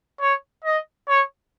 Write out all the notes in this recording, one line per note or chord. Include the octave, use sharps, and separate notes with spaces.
C#5
D#5
C#5